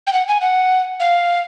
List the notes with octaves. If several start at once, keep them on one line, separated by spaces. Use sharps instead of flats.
G5
F#5
G#5
F#5
F5